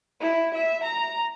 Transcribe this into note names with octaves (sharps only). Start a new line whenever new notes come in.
E4
E5
A#5